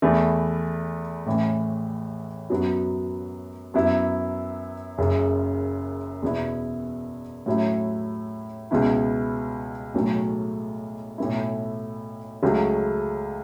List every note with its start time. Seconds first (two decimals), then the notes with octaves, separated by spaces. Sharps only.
0.02 E2 E3 A3
1.26 A1 A2 E3
2.50 F#2 F#3 B3 F#4
3.74 F#2 F#3 B3 E4
4.98 F#1 F#2 C#3
6.22 E2 B2 B3 E4
7.46 A2 F#3 C#4 E4
8.71 C#2 B2 B3 E4
9.94 B1 A2 F#3 A3
11.18 B1 A2 A3 E4
12.42 C#2 C#3 F#3 A3